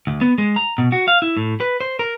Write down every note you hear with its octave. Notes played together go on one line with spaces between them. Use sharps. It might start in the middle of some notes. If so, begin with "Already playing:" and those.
D2
B3
G#3
A#5
B2
F#4
F5
E4
A2
B4
C5
A#4